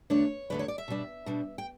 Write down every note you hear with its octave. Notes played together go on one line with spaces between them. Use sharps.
E2 D3 A3 D4 C#5
E2 D3 A3 D4 B4
C#5
D5
E5
B2 G3 D4
B2 G3 D4
G5